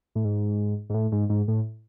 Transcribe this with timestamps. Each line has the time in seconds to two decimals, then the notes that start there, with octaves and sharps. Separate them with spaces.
0.15 A2
0.25 G#2
0.90 G#2
0.94 A2
1.12 G#2
1.29 G#2
1.48 A2